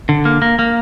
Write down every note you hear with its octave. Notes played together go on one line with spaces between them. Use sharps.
D3
A#3
A#3
A#3